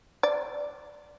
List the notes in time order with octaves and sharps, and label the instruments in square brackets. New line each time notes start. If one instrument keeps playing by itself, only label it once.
[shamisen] D5